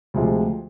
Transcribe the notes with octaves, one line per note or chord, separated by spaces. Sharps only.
D2 C3 F3 G#3